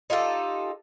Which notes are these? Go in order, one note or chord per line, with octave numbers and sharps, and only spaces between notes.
D#4 F4 G4 A4